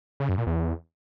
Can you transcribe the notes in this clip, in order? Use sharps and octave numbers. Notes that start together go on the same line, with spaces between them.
C#3
F#2
A#2
E2